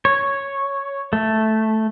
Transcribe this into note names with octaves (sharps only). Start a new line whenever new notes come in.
C#5
A3